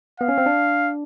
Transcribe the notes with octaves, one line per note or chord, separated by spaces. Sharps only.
B3 F5
C#4
C4
D4